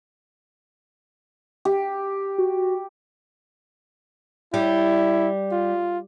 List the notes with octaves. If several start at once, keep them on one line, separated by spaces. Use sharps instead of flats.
G4
F#4
G3 E4
F4